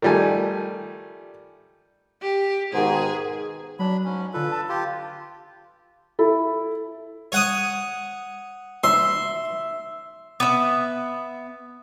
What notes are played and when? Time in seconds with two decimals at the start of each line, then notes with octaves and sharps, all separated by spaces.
0.02 D#3 F3 G3 A3 G#5
2.23 G4
2.73 G#2 B2 D#3 G#4
3.79 F#3 D4 B5
4.04 G#2 C#4
4.34 D3 D4 F4 A4 B4
4.51 A5
4.69 F4 G4
6.19 E4 A4
7.32 C#5 F#5 D#6
8.84 E5 C6
10.40 B3 E5